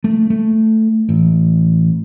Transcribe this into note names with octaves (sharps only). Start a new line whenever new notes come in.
A3
A3
A1